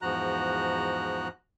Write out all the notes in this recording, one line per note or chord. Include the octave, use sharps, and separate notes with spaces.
E2 G#2 F3 F#4 A#5 F#6